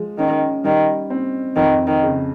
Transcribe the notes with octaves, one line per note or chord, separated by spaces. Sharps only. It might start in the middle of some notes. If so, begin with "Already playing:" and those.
Already playing: F3 G#3
D#3 C#4
D#3 G3
C4
F2 D#3
D#3
C#3